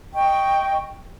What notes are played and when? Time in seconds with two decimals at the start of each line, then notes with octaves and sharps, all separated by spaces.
0.14 D#5 G5 C#6